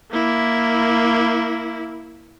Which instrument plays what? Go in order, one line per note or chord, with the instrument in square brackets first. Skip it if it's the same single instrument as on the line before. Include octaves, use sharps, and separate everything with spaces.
[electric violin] A#3 E4